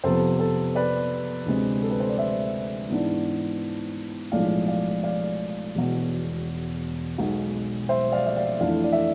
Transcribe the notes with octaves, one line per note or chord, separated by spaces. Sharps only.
F2 C3 F3 B3 A4 C5
A4 C5
B4 D5
D2 C3 G#3 C4
A4
B4
C5
D5
C5 E5
G#2 E3 B3 D4
B1 A2 F3 G#3 D5 F5
D5 F5
D5 F5
E1 E2 B2
B1 B2 G#3
C5 E5
D5 F5
E5
D5 F5
F2 E3 A3 D4 D5 F5
D5
E5